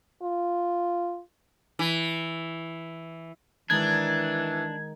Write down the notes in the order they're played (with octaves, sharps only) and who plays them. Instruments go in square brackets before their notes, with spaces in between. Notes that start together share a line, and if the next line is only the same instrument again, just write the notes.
[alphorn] F4
[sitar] E3
[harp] D#3 G#3 [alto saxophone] E3 [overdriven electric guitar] D4 [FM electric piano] G#6